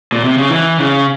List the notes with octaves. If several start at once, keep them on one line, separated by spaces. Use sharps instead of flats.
A#2
C3
C#3
E3
C#3